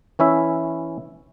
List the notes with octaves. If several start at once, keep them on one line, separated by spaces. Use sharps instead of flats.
E3 C#4 E4 E5